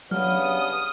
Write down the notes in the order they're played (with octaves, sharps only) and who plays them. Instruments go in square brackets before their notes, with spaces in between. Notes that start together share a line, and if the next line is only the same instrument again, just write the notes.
[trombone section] G2 C#3 B3 [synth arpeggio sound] F#3 [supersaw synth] D#6 [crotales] F6